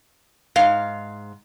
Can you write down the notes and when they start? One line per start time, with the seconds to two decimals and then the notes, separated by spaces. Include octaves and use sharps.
0.56 G#2 F5